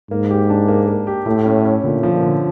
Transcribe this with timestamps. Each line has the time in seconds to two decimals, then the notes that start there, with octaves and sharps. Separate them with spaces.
0.11 G#2 A#3
0.30 G4
0.50 D4
0.68 A#3
0.88 A#3
1.07 G4
1.26 A2 A3
1.46 C#4
1.65 C#4
1.84 A#2 D3
2.03 F3
2.13 A#2
2.23 D3